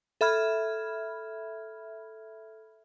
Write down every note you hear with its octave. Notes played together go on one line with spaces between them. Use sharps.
A4 E5 B5 F6 G#6